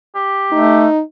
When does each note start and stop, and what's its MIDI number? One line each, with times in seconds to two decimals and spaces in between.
0.15 0.85 67
0.52 0.87 57
0.52 1.02 63